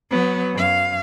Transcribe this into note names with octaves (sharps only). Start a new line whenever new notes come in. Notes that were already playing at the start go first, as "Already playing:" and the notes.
F#3 B3
F#2 F5